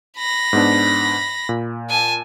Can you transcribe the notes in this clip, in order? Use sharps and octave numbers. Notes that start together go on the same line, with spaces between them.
B5 A#6
G#2 B3 D4
A#2
G#5 A5